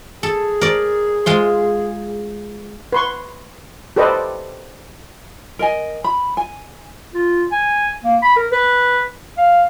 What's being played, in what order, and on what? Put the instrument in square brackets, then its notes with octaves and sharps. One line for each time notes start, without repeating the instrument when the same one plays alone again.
[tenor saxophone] G#4 [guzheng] A4
[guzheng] A#4 D5
G#3 F4 C6
[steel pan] B4 C6 C#6
G4 A4 B4 C5 D5 D#5
[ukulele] A#4 D#5 G#5
B5
G#5
[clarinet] F4
G#5
A#3
B5
A#4
B4
F5